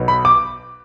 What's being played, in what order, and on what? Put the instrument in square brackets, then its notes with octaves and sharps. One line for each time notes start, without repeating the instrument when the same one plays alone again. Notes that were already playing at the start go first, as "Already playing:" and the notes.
Already playing: [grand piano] B1 B2 B3
B5
D6